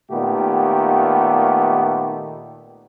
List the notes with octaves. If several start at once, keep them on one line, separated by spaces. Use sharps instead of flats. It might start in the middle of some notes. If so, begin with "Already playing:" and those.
A#2 D#3 A3 B3 G4